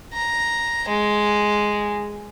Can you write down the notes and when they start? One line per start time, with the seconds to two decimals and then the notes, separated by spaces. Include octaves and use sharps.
0.13 A#5
0.88 G#3